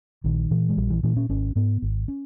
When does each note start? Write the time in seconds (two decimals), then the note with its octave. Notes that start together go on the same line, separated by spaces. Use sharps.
0.24 A#1 D#3
0.51 A#2 E3
0.69 G#3
0.77 A#1 G3
0.90 E3
1.03 A#2 E3
1.17 C#4
1.29 G#1 C#4
1.56 G#2 B3
1.82 G#1
2.08 C#4